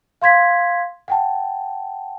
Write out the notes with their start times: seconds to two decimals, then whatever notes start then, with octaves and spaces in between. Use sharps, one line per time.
0.22 F5 C6 G#6 B6
1.08 F#5 G5 A5